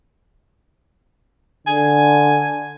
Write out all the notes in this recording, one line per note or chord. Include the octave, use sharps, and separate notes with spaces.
D3 G#5